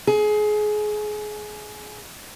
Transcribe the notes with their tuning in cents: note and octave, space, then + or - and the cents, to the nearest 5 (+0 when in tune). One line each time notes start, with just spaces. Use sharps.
G#4 +25